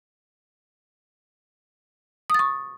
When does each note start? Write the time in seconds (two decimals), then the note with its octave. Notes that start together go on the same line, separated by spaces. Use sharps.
2.30 D#6
2.34 A6
2.39 C#6